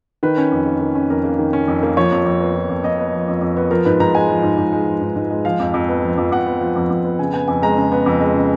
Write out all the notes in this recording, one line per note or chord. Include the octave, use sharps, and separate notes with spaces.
D#3 B4
C#4
F2
A#3
D#3
C#4
F2 A#4
A#3
D#3
C#4
F2
A#3
F3 C#5
F2
F2
B3
F3
F2
F2 D#5
B3
F3
F2
F2
B3
F3 A#4
G#2 B4
G#2 A#5
G#3 G#5
F3
G#2
G#2
G#3
F3
G#2
G#2
G#3
F3 F5
F2
F2
B3
F3
F2
F2 F#5
B3
F3
F2
F2
B3
C#3 G#5
B3 G#5
F2 G#5
G#3 A#5
C#3
B3
F2
G#3
C#3